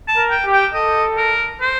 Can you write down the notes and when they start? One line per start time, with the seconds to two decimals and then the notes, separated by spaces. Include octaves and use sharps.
0.08 A5
0.16 A#4
0.31 G5
0.45 G4
0.52 G5
0.74 A4 D#5
1.17 A#4
1.61 C5